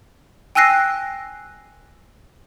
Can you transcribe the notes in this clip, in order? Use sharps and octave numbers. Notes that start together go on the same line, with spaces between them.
G5 G#5 E6 F#6 A#6 C7